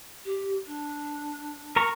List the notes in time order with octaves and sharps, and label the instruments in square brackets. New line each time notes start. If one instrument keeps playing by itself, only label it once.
[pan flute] G4
D4
[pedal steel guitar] A#4 A#5 C#6